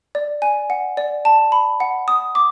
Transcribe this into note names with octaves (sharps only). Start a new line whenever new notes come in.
D5
G#5
F#5
D5
A5
B5
F#5
D#6
D6